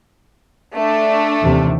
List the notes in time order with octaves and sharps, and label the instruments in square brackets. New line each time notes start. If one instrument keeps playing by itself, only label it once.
[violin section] A3 D4
[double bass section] D#2 C3 E3